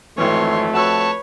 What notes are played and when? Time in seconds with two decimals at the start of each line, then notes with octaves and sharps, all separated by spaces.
0.18 G#1 F2 E3 A3 C#5 C6
0.74 F#4 B4 C#5 A5 E6